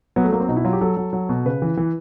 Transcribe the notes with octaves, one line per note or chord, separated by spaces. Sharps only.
F#3 B3
A3
F#3 A#3
C4
B2 D#4
E4
F#3 F4
G4
F#3 A4
F#3
F#3
B2
C#3 B4
E3
E3